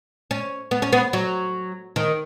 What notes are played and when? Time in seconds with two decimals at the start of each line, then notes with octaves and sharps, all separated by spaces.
0.31 C#4
0.71 B3
0.82 C#4
0.93 B3
1.13 F#3
1.96 D#3